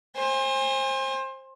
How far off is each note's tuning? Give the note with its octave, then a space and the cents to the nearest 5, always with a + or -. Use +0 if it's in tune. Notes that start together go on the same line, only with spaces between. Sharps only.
C5 +25 G#5 -30